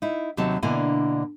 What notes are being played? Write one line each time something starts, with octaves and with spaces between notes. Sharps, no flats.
D#4 E4
D#2 C3 F#3 D#4 A5
B2 D3 A#3 D4 E4 G#5